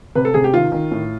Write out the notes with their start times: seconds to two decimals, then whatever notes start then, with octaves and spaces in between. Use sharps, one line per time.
0.15 C3 B4
0.25 A4
0.34 C3 G#4
0.44 G4
0.54 D#3 F4
0.72 D#3
0.91 A2